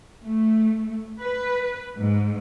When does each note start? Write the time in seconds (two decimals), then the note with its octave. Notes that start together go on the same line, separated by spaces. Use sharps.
0.24 A3
1.22 B4
1.97 G#2